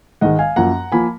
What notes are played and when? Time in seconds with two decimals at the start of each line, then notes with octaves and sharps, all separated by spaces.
0.21 G#2 D#3 G#3 D#5 F#5
0.39 F5 G#5
0.56 F#2 F3 A#3 F#5 A#5
0.92 F3 A#3 G#5 B5